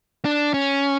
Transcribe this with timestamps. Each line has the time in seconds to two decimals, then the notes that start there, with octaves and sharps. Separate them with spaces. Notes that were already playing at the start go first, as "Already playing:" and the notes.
0.25 D4
0.54 C#4